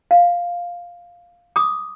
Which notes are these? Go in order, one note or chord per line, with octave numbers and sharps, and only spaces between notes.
F5
D6 D#6